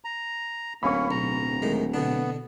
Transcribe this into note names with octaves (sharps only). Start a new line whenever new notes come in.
A#5
D1 A#3 C#4 B5 C#6
B1 A#5
A2 D#3 G#3
B2 D3 B3 D4